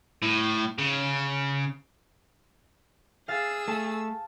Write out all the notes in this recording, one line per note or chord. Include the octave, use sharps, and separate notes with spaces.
A2
C#3
G#4 F5 E6 A6
A3 A5